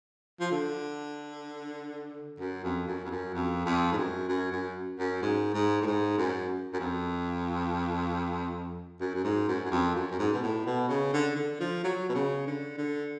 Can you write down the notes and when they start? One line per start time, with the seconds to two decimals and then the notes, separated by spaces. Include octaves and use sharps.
0.40 F3
0.51 D3
2.40 F#2
2.64 F2
2.87 F#2
3.04 F2
3.10 F#2
3.34 F2
3.66 F2
3.92 G#2
3.97 F#2
4.29 F#2
4.52 F#2
4.99 F#2
5.22 G#2
5.54 G#2
5.82 A2
5.86 G#2
6.18 F#2
6.73 F#2
6.80 F2
9.01 F#2
9.15 F#2
9.24 G#2
9.48 F#2
9.65 F#2
9.71 F2
9.95 F#2
10.11 F#2
10.19 G#2
10.33 B2
10.42 A2
10.66 B2
10.89 C#3
11.13 D3
11.36 D3
11.60 F3
11.84 F#3
12.09 B2
12.15 C#3
12.47 D3
12.78 D3